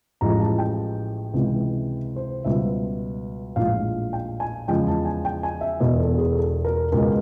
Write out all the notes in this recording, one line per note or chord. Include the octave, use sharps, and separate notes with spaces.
A1 A2 F3 G#3 A#5
A5
G5
C#2 C3 E3 G#3
C5
C#2 B2 G3 E5
A#1 A2 F3 G#3 F5
G5
G#5
E2 C#3 F3 G#3 G5
A5
G#5
G5
G#5
E5
E1 E2 B2 D#5
A4
G#4
A4
A#4
C#2 B2 G#3 A#4